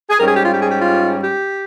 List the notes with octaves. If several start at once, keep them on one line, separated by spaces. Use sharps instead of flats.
G#4
G#2 G3 C#4 A#4
G#4
G4
F4
G4
G#4
G4
F4
G4